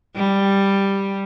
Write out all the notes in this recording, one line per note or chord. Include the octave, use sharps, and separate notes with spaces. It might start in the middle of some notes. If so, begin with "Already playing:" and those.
G3